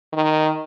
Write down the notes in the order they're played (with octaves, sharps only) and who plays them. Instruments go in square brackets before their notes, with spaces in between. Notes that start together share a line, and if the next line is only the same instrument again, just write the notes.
[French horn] D#3